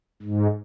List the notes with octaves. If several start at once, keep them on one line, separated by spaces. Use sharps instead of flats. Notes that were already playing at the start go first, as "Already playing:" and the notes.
G#2